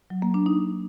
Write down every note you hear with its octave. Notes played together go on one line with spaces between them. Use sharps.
F#3
A#3
D4
D#4